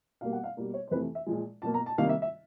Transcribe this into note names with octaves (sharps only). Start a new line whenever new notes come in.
B2 G3 A#3 F5
F#5
F5
B2 G3 A#3
C#5
C5
F2 C3 E3 A3 B4
E5
A#2 F3 G#3
B2 F#3 A#3 A5
A#5
A5
C3 D#3 G3 A#3 F5
E5
E5